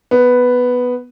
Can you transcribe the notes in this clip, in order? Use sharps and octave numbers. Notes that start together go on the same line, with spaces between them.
B3